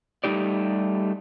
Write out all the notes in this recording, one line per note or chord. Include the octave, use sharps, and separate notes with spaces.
G3 A3 D#4 G4 D5